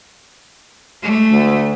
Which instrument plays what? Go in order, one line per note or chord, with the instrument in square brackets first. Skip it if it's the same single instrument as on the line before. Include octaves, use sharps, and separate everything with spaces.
[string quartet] A3
[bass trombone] D2